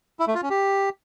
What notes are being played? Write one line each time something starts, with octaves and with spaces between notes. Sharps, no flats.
E4
A3
F4
C#4
G4